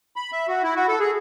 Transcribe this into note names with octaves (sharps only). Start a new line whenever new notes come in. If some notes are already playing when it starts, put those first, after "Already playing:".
B5
E5
F#4
E4
F#4
A4
G#4